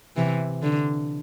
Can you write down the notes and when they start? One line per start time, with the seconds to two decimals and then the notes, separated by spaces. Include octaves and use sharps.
0.17 C3 E3
0.63 D3